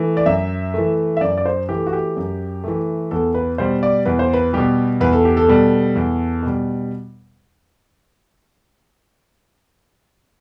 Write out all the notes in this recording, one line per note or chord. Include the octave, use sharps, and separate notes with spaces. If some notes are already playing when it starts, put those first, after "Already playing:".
Already playing: E3 A3
D5
F#2 E5
E3 A3
E5
F#2 D5
D5
C5
E3 A3 G4
F#4
G4
F#2
E3 A3
E2 A4
B4
B2 G3 C5
D5
E2 B4
C5
B4
B2 G3 G4
E2 B4
A4
G4
A4
B2 G3
E2
B2 G3